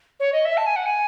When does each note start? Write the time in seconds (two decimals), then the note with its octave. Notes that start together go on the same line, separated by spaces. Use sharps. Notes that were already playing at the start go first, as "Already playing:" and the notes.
0.20 C#5
0.33 D#5
0.45 E5
0.57 A5
0.66 G#5
0.76 F#5
0.86 G#5